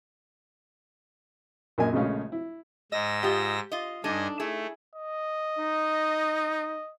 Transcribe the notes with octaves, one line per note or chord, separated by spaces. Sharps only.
A#1 F#2 A#3 D#5 G#5
A#1 C#3 G#3 A3 C#4 F5
E4
G#2 D#5 E6 A#6
F4 G4 D#5
F4 D#5
G2 D4 D#4 A4 D#5 G#5
A3 E4 G#4
D#5
D#4